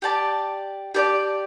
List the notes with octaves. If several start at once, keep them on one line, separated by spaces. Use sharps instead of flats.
G4 D5 A5
G4 D5 A5